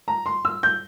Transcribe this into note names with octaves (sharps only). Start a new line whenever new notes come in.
A#5
C6
E6
G6